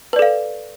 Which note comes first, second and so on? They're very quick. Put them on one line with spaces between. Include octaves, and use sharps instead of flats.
B4 D5 A4 F5